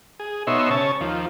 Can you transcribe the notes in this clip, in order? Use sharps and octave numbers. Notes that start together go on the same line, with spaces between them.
G#4
B2 D#4 C#5 E5 C6
C#3 C#5 A5
D#2 F3